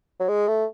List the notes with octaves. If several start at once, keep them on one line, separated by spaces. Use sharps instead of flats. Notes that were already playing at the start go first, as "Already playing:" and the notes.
F#3
G#3
A3